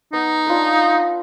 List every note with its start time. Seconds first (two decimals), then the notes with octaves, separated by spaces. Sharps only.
0.13 B3 D#4
0.46 D4 F4 B4